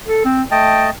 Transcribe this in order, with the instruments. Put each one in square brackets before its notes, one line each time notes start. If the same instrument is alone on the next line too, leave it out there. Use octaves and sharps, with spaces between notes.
[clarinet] A4
C4
[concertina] A3 D#5 A5 [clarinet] G5